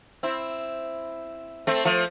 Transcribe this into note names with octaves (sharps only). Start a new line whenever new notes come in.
C4 E4
A3 C4
F3 A3